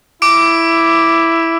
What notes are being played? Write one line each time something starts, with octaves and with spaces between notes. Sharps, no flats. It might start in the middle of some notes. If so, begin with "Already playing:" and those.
E4 D6 D7